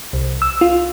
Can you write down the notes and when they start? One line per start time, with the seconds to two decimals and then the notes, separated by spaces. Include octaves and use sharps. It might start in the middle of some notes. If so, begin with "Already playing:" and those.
0.13 C2
0.42 E6
0.61 F4